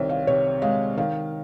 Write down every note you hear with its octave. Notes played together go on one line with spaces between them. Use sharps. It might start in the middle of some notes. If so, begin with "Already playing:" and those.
Already playing: C2 D#3 C5 C#5
F5
C3 C#5
G#3 F5
D#3 F5